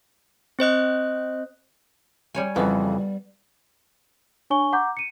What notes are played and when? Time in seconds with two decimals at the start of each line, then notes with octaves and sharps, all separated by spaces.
0.59 C4 C5 D#5 F#6
2.35 G3 C#5 G#5
2.56 F2 C#3 E3 G3 B3
4.50 D4 C#5 G#5 C#6 G7
4.73 F#5 A#5 D6 G6
4.97 C#7 D#7